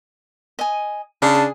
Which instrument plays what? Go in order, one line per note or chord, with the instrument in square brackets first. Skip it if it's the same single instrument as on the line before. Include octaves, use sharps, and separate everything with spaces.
[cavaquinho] D#5 G#5
[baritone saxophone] C#3 [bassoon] D4 [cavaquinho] D5 C6 [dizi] A5
[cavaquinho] G#4